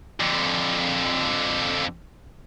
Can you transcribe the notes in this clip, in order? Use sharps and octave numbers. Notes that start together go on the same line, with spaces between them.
F2 D3